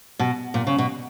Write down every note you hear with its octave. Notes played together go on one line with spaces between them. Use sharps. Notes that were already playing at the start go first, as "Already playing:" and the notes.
B2
A#2
C#3
B2